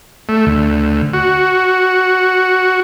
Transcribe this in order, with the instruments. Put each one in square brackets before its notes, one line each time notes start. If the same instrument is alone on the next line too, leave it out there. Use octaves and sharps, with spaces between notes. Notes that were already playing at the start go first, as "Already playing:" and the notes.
[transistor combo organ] A3
D2
F#4